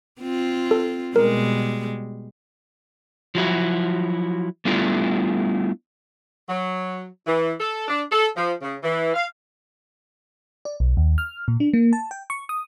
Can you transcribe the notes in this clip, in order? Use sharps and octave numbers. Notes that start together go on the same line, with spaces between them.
C4 F4
A4
B2 G3 G#3 A#4
F3 F#3 E4 F#4
G3 A3 B3 D4 E4 F4
F#3
E3
A4
D4
A4
F3
C#3
E3
F5
D5
B1
D#2
F6
A#2
D4
A#3
A5
G5
C#6
D#6